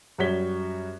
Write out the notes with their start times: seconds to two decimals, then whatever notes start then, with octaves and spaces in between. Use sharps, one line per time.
0.18 F#2 G3 F#4 C#5 B6 G7